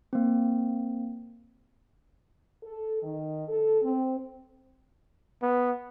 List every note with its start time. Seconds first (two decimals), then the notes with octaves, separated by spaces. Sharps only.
0.13 A#3 C4
2.63 A4
3.02 D#3
3.48 A4
3.82 C4
5.42 B3